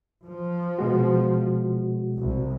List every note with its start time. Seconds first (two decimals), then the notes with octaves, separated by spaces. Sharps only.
0.24 F3
0.79 B2 G#3 F#4
2.17 C2